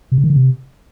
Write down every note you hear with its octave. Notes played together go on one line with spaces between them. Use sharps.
C3
C#3
D#3
D3
C3